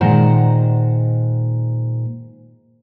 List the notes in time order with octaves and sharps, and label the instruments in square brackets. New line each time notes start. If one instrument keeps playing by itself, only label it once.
[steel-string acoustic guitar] A#2 D#3 G#3 C5 F#5 A#5